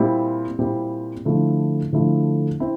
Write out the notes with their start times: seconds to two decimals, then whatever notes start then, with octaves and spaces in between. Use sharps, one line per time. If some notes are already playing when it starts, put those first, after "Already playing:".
Already playing: A#2 G3 C4 E4
0.59 A#2 G3 C4 E4
1.25 D3 F3 A3 E4
1.93 D3 F3 A3 E4
2.60 C4 E4